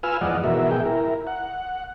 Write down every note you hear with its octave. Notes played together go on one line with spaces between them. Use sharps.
F4 B4 G#5 E6 F6
E2 G#2 F3 D5 D#5 F#5
G#2 B2 E3 F#4 A#4 E5
G#2 B2 G#4 G5
E4 A#4
F#5